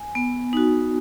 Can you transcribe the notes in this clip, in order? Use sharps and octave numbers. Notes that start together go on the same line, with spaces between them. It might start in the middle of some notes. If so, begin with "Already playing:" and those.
Already playing: G#5
B3
D#4 F#4